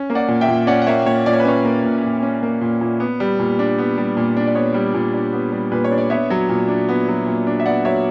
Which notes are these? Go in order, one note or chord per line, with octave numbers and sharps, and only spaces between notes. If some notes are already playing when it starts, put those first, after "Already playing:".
Already playing: C#4
A#3
D5 F#5
A#2
E5 G5
A#2
C#4 D5 F#5
F#5
A#3 C#5 E5
A#2 C#5
A#2 D5
C#5
B4
C#4 C#5
A#3
A#2
A#2
C#4
A#3
A#2
A#2
B3
G3
A#2
D4
B3
G3
A#2
D4
D5
B3 C#5
G3
A#2
D4
B3
G3
A#2 B4
C#5
D4
D5
B3 C#5 E5
F#3
A#2
D4
B3
F#3
A#2
D4
E5
B3 D5 F#5
F#3 C#5 E5